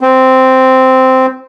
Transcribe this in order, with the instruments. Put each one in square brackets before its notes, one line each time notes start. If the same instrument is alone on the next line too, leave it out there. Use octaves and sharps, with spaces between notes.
[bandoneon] C4